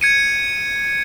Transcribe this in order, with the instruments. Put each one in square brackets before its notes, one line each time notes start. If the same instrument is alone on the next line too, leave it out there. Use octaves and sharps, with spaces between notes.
[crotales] G#6 C#7 D#7